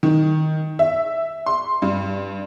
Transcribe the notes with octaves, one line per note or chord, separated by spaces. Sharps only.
D#3
E5
C6
G2